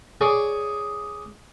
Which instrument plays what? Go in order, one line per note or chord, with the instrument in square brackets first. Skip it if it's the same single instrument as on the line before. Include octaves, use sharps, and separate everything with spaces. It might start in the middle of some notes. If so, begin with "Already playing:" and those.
[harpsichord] G#4 C#5 D5